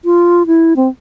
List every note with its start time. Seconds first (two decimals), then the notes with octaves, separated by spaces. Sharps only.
0.05 F4
0.47 E4
0.76 C4